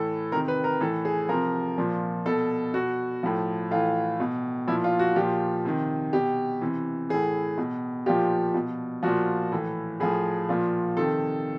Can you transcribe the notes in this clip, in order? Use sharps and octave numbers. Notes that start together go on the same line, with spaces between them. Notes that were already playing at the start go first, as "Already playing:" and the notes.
Already playing: A2 E3 A4
C3 D#3 A#4
B4
A#4
A2 E3 A4
G#4
C3 F3 A#4
A#2 F3
B2 A4
B2 F#4
A2 F3
A2 E3 F4
B2
A#2 F3 E4
F4
F#4
A#2 F3 G4
C3 D#3
B2 G4
C3 E3
A2 E3 G#4
B2
A#2 F3 G4
B2
A#2 F3 F#4
A2 E3
A2 F3 G#4
A#2 F3
C3 D#3 A4